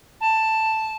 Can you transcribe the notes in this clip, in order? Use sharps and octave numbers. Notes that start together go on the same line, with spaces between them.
A5